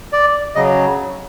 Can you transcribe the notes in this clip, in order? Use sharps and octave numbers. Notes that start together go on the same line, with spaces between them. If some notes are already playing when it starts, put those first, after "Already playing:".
D5
C#3 F#3 D#5